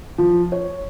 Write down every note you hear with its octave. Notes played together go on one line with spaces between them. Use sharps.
F3
C#5